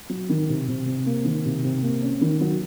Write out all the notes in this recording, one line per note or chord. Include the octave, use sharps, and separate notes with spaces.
F#3
D#3
C3
C3
C3
A#3
D#3
C3
C3
A#3
C#4
D#3
F#3